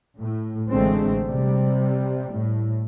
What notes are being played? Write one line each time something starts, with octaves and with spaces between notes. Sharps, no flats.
A2
A1 D3 G#3 A3 C4
C3 G3
A2